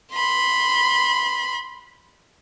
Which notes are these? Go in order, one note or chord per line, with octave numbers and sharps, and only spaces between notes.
B5 C6